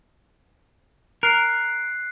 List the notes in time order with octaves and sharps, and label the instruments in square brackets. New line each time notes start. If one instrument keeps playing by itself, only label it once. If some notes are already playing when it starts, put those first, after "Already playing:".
[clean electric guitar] A#4 [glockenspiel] F#6 C7